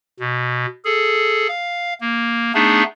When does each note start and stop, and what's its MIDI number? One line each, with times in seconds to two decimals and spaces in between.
0.20 0.66 47
0.85 1.47 68
0.85 1.47 69
1.48 1.94 77
2.01 2.52 58
2.54 2.83 57
2.54 2.83 59
2.54 2.83 62
2.54 2.83 63
2.54 2.83 68